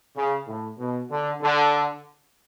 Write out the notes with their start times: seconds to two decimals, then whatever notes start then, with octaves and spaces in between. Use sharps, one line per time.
0.15 C#3
0.46 A2
0.78 B2
1.10 D3
1.42 D3